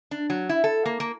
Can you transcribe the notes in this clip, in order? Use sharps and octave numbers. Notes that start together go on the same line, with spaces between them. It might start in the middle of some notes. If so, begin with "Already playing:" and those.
D4
F#3
E4
A4
A#3
A#3